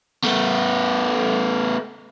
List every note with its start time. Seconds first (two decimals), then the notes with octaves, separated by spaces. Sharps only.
0.24 A3 B3